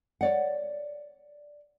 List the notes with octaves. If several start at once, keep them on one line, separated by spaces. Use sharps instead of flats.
C#5 D5 F#5